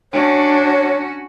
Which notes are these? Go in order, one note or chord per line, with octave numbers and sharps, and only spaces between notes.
C#4 D4 F#4 C#5